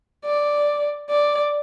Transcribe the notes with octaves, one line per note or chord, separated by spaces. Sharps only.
D5
D5